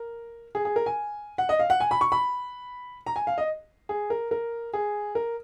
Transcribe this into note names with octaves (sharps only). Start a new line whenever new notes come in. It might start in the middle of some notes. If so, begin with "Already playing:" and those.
Already playing: A#4
G#4
G#4
A#4
G#5
F#5
D#5
F5
F#5
G#5
B5
C#6
B5
A#5
G#5
F5
D#5
G#4
A#4
A#4
G#4
A#4